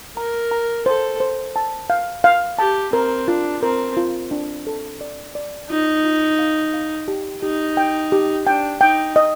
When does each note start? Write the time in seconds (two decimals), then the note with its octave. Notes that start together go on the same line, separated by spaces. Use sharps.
0.17 A#4 A#5
0.51 A#5
0.86 A4 C5
1.20 C5
1.56 A5
1.90 F5
2.24 F5
2.59 G4 A5
2.93 C4 A#4
3.28 D4 F4
3.63 C4 A#4
3.97 F4
4.31 D4
4.67 A4
5.01 D5
5.35 D5
5.70 D#4 F4
6.04 F4
6.39 F5
6.73 F5
7.08 G4
7.43 D#4 G4
7.77 G5
8.12 G4
8.47 D4 G5
8.81 D#4 G5
9.16 D#5